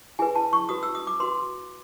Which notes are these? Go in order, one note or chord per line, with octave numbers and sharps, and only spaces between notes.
E4 G#4 B4 G#5
A5
C#6
F#4 B4 D#6
E6
D#6
D6
F#4 B4 C6